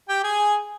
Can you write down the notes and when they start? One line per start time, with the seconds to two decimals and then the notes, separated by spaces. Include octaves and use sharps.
0.09 G4 G5
0.23 G#4 G#5